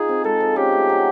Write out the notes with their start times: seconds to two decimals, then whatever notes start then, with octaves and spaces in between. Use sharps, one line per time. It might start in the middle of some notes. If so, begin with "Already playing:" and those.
Already playing: D#4 F4 G#4
0.09 C4
0.24 G#3 A4
0.40 F3
0.56 C#4 G4
0.72 A3
0.89 F#3